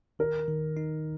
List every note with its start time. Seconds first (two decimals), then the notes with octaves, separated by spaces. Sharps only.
0.19 D#3 A#4
0.48 D#3
0.77 D#4